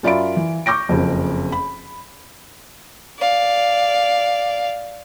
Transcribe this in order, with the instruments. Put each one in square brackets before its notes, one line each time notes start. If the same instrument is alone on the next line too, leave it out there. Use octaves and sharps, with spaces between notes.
[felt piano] F#2 F4 D5 E5 B5 D7
E3
C#6 D6 G6 A#6 D7
F#1 F2
B5
[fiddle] D5 F5